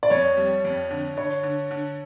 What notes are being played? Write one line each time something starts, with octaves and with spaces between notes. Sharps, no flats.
D5
F2 C#5
G3
F2
D3
D3 C#5
D3
D3